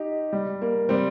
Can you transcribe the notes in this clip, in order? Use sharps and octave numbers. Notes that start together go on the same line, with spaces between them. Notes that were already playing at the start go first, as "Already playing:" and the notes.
Already playing: D#4 G4
G3
A#3
G3 C4